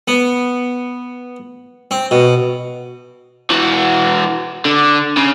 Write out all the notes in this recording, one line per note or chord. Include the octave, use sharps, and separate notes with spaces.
B3
C4
B2
E3 F#4
D3
C#3